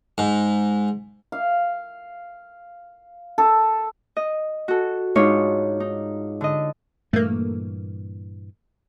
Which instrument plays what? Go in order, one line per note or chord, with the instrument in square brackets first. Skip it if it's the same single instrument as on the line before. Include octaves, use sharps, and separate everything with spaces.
[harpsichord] G#2
[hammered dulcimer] F5
A4
[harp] D#5
F#4 A4
G#2 D4 D#4 F4 C#5
D#4
D3 D#5
[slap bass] G2 A#2 E3 [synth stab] A3 A#3